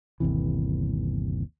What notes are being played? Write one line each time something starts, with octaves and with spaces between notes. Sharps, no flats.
G1 D#2 C3 E3